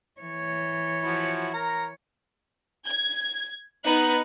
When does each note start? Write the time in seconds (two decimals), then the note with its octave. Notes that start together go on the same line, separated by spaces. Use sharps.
0.21 E3 C#5
1.03 F3 E4 F#4
1.54 A#4 A#5
2.87 G#6
3.83 B3 D#4 F#6